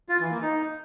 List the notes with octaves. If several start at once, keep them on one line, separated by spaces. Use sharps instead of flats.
F4
E3
A#3
D#4